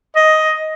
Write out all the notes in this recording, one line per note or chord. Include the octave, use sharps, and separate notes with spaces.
D#5